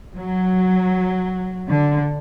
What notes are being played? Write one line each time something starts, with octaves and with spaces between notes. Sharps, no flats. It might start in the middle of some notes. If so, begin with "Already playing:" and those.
F#3
D3